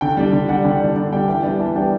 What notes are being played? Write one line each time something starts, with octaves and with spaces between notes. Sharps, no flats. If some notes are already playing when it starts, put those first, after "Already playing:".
D3 G5
G3 D4
D3
G3 D4 F#5
D3 G5
G3 D4
D3
G3 D4 G5
E3 G5
G3 B3 D4
E3 A5
G3 B3 D4 G5